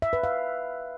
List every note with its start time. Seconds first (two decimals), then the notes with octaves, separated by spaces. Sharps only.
0.02 E5
0.13 B4
0.24 F5